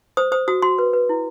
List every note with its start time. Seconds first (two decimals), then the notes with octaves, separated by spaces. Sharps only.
0.17 C5 D#6
0.32 C5 D#6
0.48 F#4 D#6
0.62 F#4 C6
0.78 B4
0.93 B4
1.09 E4